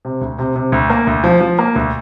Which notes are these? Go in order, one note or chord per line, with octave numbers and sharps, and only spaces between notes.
C3
D2
C3
C3
D2
A#3
D2
F3
F3
A#3
D2